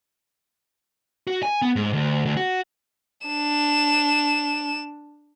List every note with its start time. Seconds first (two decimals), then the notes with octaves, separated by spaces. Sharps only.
1.27 F#4
1.43 G#5
1.62 B3
1.76 G#2
1.93 D2
2.25 D2
2.37 F#4
3.27 D4 E7